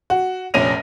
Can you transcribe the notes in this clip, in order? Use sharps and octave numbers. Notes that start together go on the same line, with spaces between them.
F#4
F1 A#1 C#4 A#6 D#7 F7